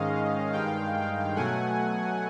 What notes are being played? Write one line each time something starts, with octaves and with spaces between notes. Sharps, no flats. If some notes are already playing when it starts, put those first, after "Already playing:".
Already playing: G#2 D#3 G#3 C#4 D#5 F5
G2 D#3 G#3 F5 G5
B2 F#3 A3 F#5 G#5